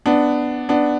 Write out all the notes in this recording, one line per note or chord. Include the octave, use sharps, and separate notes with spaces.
B3 D4
B3 D4